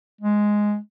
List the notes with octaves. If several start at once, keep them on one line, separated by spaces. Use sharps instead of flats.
G#3